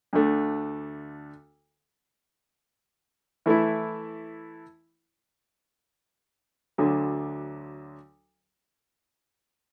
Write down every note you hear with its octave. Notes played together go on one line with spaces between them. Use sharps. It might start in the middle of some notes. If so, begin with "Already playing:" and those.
D2 D3 A3
E3 A3 E4
D2 D3 F#3